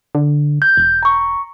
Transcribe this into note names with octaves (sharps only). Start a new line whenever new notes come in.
D3
G6
E1
A#5 C#6